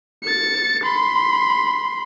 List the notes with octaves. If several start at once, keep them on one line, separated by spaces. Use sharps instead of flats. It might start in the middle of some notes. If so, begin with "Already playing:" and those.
A6 C#7
B5 C6